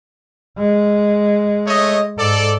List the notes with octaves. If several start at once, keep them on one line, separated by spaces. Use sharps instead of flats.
G#3
A3 C#5 D#5
G#2 A4 D5